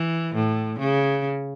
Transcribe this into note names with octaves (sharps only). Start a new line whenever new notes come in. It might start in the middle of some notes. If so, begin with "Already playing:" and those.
Already playing: E3
A2
C#3